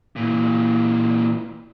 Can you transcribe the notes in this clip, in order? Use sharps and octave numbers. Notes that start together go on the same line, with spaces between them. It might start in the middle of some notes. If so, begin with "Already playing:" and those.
A#2 E3